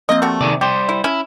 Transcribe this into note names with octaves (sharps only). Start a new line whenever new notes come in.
F3 A#3 C4 D#5
G3 A3 F#4
C3 D#3 G#4 D5
G3 G4 C5
E4
C#4 E4